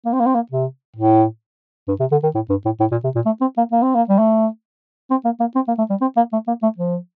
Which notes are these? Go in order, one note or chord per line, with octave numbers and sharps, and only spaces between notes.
A#3
C4
A#3
C4
A#3
C3
A2
G2
C3
D3
D#3
A2
G2
A2
A2
A#2
C3
A#2
A3
C4
A#3
A#3
C4
A#3
G3
A3
C4
A#3
A#3
C4
A#3
A3
G3
C4
A#3
A3
A#3
A3
F3